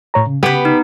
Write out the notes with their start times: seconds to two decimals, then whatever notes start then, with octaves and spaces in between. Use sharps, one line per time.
0.14 A2 C#5 A#5
0.26 C#3
0.43 B3 G4 B4
0.65 D#4